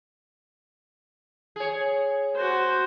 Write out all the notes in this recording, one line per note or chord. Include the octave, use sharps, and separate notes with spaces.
G#4 C#5
F#4 C5